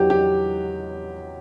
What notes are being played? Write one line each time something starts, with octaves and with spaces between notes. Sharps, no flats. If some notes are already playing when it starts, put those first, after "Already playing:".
Already playing: E2 F#3 B3 G4
G4